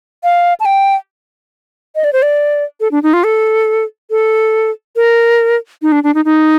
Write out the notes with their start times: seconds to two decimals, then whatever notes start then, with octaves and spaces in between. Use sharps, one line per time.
0.24 F5
0.60 A5
0.65 G5
1.96 D#5
2.04 D5
2.13 C5
2.22 D5
2.80 A4
2.92 D4
3.03 D#4
3.13 F4
3.24 A4
4.10 A4
4.96 A#4
5.82 D#4
5.92 D4
6.04 D4
6.15 D#4
6.25 D#4